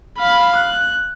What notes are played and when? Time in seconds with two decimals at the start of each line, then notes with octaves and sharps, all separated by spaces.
0.19 F5 B5
0.56 F#6